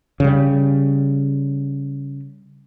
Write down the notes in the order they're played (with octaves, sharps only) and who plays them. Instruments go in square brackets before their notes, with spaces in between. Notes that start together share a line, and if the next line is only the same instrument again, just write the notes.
[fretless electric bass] C#3 G3